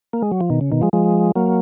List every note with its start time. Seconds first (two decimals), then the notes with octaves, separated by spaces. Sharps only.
0.13 A#3
0.22 G#3
0.31 F#3
0.41 F3
0.50 B2 D#3
0.61 C#3
0.72 B2 D#3
0.82 F3 G#3
0.93 F3 G#3
1.36 F#3 A#3